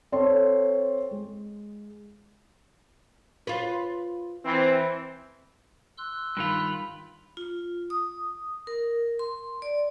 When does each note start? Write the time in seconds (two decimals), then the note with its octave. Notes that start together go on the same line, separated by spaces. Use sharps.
0.12 C4 A4 C#5 C6
1.11 G#3
3.47 F4 B4
4.45 E3 C4
5.98 C6 E6 F#6
6.37 G2 D#3 F4 B5
7.37 F4
7.90 D#6
8.67 A#4
9.19 C6
9.62 D5